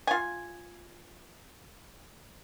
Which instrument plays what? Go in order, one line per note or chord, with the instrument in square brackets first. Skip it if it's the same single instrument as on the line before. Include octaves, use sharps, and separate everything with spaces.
[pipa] F4 G#5